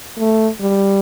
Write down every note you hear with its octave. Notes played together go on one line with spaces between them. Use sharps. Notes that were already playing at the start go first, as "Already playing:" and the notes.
A3
G3